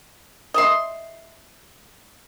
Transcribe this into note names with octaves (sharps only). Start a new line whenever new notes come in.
D#5 E5 C6